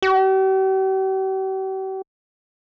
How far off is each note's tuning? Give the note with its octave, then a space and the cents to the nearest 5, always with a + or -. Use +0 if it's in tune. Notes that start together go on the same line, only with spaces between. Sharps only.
G4 -45